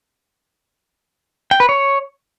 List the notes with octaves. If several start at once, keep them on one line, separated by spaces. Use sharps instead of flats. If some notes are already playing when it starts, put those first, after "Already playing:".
G5
B4
C#5